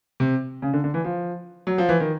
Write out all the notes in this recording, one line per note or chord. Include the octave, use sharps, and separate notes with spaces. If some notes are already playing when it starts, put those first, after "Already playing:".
C3
C#3
D3
D3
E3
F3
F#3
F3
E3
D#3